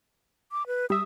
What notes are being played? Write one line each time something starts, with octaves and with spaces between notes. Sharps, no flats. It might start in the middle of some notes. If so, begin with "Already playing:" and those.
D6
B4
G3 E5 D#6